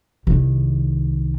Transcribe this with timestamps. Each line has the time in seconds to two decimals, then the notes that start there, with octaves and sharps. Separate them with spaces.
0.27 C2 D#3